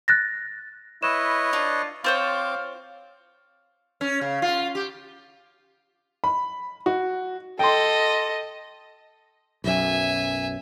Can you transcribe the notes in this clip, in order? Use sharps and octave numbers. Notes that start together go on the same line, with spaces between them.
F#6 A6 A#6
E4 B4 C#5 D#5 E7
D4 F4
C4 F4 C5 C#5 F5 D6
C#4
C#3
F4
G4
B5
F#4
A4 D#5 G5 C6
B1 F#2 E5 G#5